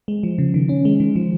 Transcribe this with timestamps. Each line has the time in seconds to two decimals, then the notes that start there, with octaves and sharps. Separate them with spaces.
0.08 G#3
0.23 F3
0.38 C#3
0.54 D#3
0.69 C#4
0.85 G#3
1.00 D#3
1.16 F3